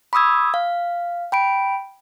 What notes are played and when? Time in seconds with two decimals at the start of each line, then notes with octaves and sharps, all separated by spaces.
0.13 B5 C#6 D#6 E6 G#6
0.54 F5
1.32 G5 B5 D7